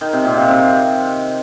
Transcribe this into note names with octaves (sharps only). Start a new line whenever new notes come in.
D#3
C3
A#2
C3
C3